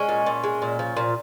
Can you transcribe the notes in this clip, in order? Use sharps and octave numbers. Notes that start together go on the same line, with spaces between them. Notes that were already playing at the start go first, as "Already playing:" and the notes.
Already playing: G#3 C#4
A#2
A#2
G#3
A#2
F3
A#2